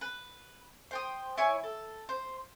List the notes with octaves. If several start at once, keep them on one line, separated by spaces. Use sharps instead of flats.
B4
C5 G5 D#6
E4 C#5 G#5
A4
C5